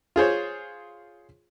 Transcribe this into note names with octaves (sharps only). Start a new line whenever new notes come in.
F4 G#4 C5 C#5